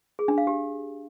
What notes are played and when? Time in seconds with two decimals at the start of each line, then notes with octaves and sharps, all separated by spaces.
0.19 G#4
0.28 D4
0.38 F5
0.47 G4